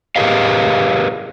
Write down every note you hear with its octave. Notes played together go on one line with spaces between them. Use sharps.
G4 G#4 A#4 B4 D#5 F5